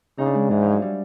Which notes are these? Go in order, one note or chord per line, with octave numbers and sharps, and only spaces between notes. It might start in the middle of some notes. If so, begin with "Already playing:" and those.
C#3 D#4
D4
G#3
G#2 E3
F3
F#3
G3